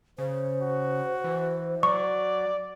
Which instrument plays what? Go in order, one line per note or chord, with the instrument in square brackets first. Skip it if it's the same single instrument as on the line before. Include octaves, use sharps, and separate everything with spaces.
[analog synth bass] C#3 [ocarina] C5
[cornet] F#4
[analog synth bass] E3
[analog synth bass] F#3 [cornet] D5 [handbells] C#6